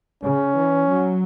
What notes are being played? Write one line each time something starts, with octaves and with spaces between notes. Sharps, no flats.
C#3 C#4
E3
F#3